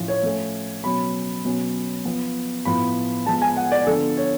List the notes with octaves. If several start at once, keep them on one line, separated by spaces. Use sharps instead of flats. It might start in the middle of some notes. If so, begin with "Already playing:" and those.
Already playing: A2 F3 C#4
C#5
F3 A3 C#4
B2 F#3 C#4 B5
B2 F#3 C#4
F3 B3
A2 F3 B3 B5
F3 G#3 B3 A5
G#5
F#5
D5
D3 F3 B3 A4
C#5